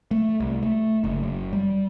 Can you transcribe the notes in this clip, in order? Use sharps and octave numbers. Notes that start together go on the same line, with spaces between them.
A3
C2
A3
F#1
F#1
G3